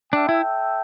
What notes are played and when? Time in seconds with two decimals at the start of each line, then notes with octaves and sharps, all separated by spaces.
0.13 D4 A4 E5 G5
0.29 E4